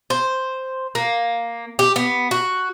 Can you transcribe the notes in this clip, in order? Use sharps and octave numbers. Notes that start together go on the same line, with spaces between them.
C5
A#3
G4
B3
F#4